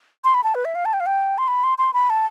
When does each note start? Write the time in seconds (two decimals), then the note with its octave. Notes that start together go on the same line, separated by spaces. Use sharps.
0.24 C6
0.34 B5
0.44 A5
0.55 B4
0.65 E5
0.75 F5
0.85 A5
0.93 G5
1.00 F5
1.06 G5
1.38 C6
1.48 B5
1.63 C6
1.78 C6
1.93 B5
2.10 A5